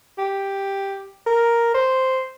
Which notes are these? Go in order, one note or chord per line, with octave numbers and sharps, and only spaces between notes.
G4
A#4
C5